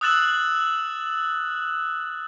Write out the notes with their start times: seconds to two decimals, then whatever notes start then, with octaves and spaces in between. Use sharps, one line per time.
0.01 D#6 E6 F#6 A6 E7 F#7